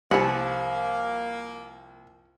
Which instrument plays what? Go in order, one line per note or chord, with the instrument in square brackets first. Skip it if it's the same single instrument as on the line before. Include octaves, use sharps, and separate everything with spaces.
[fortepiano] C2 A5 [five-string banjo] F3 F#5 [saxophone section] A#3 [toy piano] G4 G#5 C6